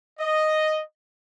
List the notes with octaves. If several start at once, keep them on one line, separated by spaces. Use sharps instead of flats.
D#5